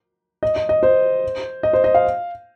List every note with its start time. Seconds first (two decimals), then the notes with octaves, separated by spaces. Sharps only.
0.43 D#5
0.56 D#5
0.69 D#5
0.83 C5
1.63 D#5
1.73 C5
1.84 D#5
1.94 F5